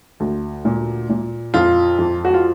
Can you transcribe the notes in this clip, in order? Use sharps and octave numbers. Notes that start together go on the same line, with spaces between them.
D2
A#2
A#2
F2 F4
F2
F#4
F4